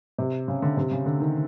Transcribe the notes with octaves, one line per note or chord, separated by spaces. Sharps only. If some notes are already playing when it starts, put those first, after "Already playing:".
C3
C#3
D3
C3
C#3
D3
D#3